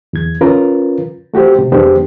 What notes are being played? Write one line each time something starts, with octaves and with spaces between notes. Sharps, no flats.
E2 G#6
C#4 F4 A#4 B4
A3 F#4 G4 C5
C3
F2 G#3 B3 D4 G4 C5